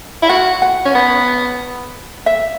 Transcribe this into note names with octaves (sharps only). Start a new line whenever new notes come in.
E4
F#4 F#5
F#5
C#4
B3
E5